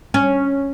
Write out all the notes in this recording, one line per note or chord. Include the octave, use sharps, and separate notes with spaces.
C#4